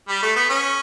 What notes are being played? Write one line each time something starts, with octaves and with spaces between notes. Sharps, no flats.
G3
A3
B3
C#4